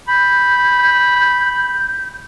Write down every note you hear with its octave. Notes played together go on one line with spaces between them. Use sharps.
B5 G6